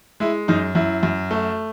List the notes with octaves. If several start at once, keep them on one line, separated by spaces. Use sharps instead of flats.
G#3 E4
F#2 D#4
F#2 E4
F#2
A3